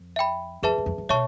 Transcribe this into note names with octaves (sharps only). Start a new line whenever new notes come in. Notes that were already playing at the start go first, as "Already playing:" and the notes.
Already playing: F2
E5 G5 B5
F2 G#4 B4 E5 A5
F#2
F2
F#2
B2 C#5 E5 A5 C#6